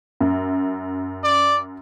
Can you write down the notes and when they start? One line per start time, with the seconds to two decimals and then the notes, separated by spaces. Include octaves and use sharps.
0.21 F#2
1.24 D5